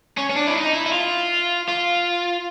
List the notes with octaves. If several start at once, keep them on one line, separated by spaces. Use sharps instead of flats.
C#4
C#4
D4
E4
D#4
E4
E4
F4
F4